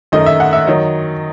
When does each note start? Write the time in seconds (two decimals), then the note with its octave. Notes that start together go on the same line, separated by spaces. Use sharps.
0.12 F#2 D#3 A3 D#5
0.26 E5
0.40 F#5
0.53 E5
0.67 D#3 F#3 D#5